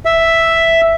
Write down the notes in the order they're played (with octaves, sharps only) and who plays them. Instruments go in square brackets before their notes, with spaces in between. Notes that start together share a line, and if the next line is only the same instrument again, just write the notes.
[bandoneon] E5